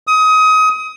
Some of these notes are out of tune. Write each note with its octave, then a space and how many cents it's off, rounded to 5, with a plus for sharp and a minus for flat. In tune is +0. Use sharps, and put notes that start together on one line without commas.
D#6 +25